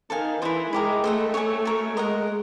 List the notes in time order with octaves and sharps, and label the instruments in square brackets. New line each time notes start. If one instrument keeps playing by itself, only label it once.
[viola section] D#3 [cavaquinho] A4 C5 F5 G#5
[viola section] E3 [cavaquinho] E4 G#4 C5
[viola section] G#3 [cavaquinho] E4 G4 A#4 D#5
[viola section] A3 [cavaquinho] C5 D#5 F#5
[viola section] A3 [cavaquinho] C#5 E5 G#5 C#6
[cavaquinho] F#4 A#4 C#5
[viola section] G#3 [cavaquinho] A#4 D#5 F#5